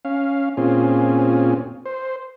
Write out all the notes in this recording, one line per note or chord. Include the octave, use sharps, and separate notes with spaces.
C#4 F5
A#2 C4 C#4 F4 G#4
C5